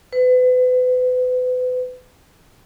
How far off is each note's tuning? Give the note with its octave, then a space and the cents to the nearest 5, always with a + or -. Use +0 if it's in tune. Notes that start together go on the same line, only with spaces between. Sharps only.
B4 +35